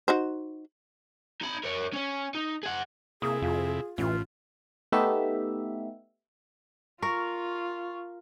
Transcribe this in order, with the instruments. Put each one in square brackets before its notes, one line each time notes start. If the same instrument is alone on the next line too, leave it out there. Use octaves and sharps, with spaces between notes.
[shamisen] D#4 F#4 C5
[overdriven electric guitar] D#4 B5
A#4 C#5
C#4 C#5
D#4
G#4 F#5
[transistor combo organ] C3 E4 [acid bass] A#3 [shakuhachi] G#4 [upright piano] D#6
[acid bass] F2 [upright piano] F4
[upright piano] A1 [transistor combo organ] A2 [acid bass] E3 [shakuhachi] F4
[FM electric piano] A3 B3 D#4 G4 E5
[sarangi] F4 [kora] A#4 [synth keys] C#6